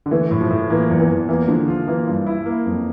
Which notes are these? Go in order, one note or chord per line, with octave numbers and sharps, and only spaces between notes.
D3
E3 A3
A2
F3
A2
E3 A#3
E2
E3
E2
E3 A#3
D3 F3
F3 F4
E3 A#3
G2
E4
A#3
F2